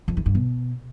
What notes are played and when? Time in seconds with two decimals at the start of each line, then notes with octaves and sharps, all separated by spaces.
0.08 F2
0.17 E3
0.26 G2
0.35 B2